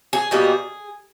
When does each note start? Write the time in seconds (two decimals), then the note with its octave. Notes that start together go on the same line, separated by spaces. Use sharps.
0.13 G#4
0.31 B2 G3 A#3 D#4 G#4